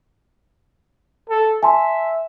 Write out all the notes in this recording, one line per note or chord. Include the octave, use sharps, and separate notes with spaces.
A4
E5 G#5 A5 C6